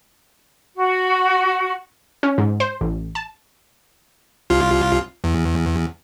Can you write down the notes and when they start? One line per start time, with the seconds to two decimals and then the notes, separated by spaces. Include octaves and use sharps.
0.77 F#4
2.23 C#4
2.38 G#2
2.60 C5
2.81 A1
3.15 A5
4.50 C2 F4
5.24 E2